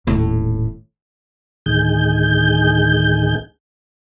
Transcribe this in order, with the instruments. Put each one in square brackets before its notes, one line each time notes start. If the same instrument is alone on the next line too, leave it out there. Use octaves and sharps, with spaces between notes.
[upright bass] D#1 A2
[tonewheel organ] D2 A2 D#3 G#4 G6